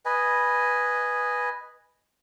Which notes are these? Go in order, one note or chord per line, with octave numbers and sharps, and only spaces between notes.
B4 D#5 G#5